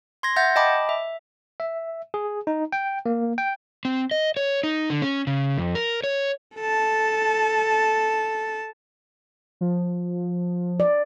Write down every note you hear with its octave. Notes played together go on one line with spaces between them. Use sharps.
C6 G#6 A#6
E5 F#5 G6 A6 A#6
D#5 G5 A5 B5 D6
E5
E5
G#4
D#4
G5
A#3
G5
C4
D#5
C#5
D#4
D3
C#4
C#3
F2
A#4
C#5
A4 A5
F3
D5